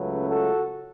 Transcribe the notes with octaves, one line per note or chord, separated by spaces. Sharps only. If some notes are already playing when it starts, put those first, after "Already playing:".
Already playing: C#2 C#3 F#3 A3 B4
F#4 A4